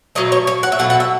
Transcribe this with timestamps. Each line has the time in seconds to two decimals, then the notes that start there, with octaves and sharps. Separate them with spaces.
0.15 B2 F#3 A3 D#5
0.32 C#5
0.47 C#5
0.63 F#5
0.72 E5
0.79 B2 F#3 A3 F#5
0.90 F#5
1.00 E5